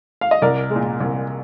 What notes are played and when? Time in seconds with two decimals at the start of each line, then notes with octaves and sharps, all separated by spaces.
0.21 F5
0.31 D#5
0.42 C2 A#4 D5
0.70 G#3
0.76 A#2
1.00 C2